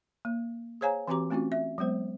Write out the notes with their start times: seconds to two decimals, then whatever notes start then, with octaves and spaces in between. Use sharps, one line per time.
0.25 A#3
0.81 G#4 C5 C#5 F5 G#5 A#5
1.08 E3 C4 F#4 G4 A#5 D6
1.30 A3 C4 C#4 F4 F#4
1.52 E5
1.78 F#3 G#3 B3 C5